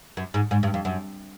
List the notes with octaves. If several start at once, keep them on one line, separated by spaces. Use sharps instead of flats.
F#2
G#2
G#2
G2
F2
F#2